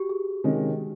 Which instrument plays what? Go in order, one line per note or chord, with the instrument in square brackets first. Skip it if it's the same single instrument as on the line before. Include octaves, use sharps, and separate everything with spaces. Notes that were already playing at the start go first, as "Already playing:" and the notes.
Already playing: [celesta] F#4 G4
G#4
[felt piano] C3 D#3 G#3 C#4